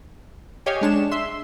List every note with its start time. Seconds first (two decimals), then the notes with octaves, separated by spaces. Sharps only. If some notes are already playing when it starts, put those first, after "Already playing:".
0.66 G4 C#5 D#5 F5 G#5
0.81 G#3 D4 E7
1.11 E5 C6